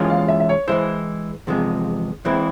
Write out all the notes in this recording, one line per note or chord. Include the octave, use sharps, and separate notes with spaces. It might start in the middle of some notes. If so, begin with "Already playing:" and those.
Already playing: E3 G#3 C#4 F4 G#4
F5
E5
E5
C#5
E3 G#3 E4 C5
E2 C3 F3 G#3
E2 E3 G#3 C4 E4 C5